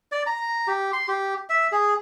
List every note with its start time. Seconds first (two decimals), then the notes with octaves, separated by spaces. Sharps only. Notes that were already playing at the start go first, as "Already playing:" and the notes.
0.12 D5
0.26 A#5
0.67 G4
0.93 C6
1.08 G4
1.50 E5
1.72 G#4